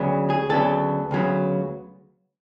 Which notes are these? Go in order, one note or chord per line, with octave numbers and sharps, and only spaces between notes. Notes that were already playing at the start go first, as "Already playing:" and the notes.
Already playing: D2 C#3 F#3 B3
G#4
D2 C#3 F#3 B3 A4
D2 C#3 F#3 B3